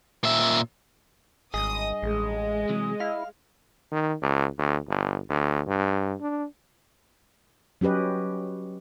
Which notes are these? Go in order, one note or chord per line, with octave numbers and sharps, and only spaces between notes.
A#2 E5
G#1 G2 G#4 D#5 D#6
A1 G#3
C3 E3 F#3
E4 F5
D#3
C#2
D2
G1
D2
G2
D4
F#3 C#4 G4 B4 D#5